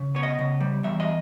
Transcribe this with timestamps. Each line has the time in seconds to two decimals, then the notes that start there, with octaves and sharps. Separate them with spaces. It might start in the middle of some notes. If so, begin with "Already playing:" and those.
Already playing: C#3
0.15 B3 C#5
0.23 D#5
0.39 C#3
0.60 G3
0.83 E2 E5
1.00 D#5